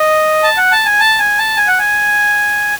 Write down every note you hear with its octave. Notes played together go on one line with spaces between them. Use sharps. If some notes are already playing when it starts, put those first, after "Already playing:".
Already playing: D#5
A5
F#5
A5
G#5
A5
G#5
A5
G#5
F#5
G#5